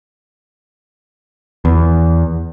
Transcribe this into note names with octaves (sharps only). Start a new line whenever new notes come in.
E2